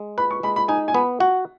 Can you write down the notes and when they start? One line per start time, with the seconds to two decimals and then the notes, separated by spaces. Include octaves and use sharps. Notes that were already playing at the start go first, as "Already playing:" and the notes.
Already playing: G#3
0.18 B4 B5
0.31 C#6
0.43 G#3 B5
0.56 B5
0.68 D#4 G#5
0.88 G#5
0.94 B3 B5
1.20 F#4 F#5